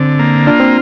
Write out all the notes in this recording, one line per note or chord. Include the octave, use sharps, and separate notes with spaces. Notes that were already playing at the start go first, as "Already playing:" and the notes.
Already playing: D3 C4
A#3
D4 F4
C4